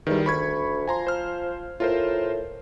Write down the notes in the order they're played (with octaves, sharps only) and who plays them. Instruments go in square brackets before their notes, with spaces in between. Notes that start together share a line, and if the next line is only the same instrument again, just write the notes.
[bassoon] E2 [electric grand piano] D#3 G3
[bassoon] D2 [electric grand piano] B5 C#6 G#6
[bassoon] F3 [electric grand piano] G#5 A#5 C6
[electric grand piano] C5 F6
[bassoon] A2 [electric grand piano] F4 A#4 C5